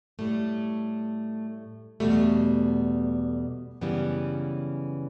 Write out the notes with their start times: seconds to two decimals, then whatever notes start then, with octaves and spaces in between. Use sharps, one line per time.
0.19 A2 G3 A3
2.00 E2 B2 G3 A3
3.81 F#2 C#3 E3 G3 B3